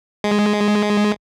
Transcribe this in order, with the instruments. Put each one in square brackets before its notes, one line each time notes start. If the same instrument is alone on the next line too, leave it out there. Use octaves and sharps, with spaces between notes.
[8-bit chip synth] G#3